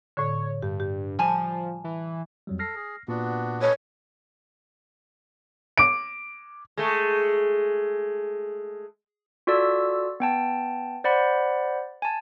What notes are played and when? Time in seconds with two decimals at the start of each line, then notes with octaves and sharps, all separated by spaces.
0.17 A2 D3 C#5
0.62 G2 G4
0.80 G4
1.19 F3 G3 G#5 A5
1.84 E3
2.47 F2 F#3 G3
2.59 A4 F6 A#6 C7
2.75 G#4
3.08 A#2 B3 D4 F#4
3.61 A4 B4 C#5 D#5
5.78 D6 D7
6.77 G#3 A3
9.47 F4 F#4 A4 D5 E6
10.20 B3 G5 A5
11.04 C5 D5 F#5 B5
12.02 G#5 A5